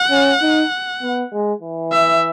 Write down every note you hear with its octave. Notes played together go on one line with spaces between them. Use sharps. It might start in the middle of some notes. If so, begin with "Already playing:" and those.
Already playing: F#5
C#4
D#4
B3
G#3
E3
E5